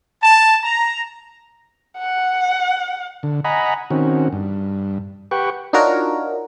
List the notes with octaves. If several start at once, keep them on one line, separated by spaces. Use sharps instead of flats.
A5
A#5
F#5
D3
D#5 F#5 G#5 A#5 B5
D#3 C4 C#4 F#4
G2
G4 B4 F#5 G5 C#6
D4 D#4 F4 F#4 A#4 C#5